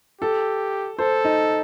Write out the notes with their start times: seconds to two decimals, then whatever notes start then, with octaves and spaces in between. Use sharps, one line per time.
0.21 G4 A4
0.98 A4 C5
1.24 D#4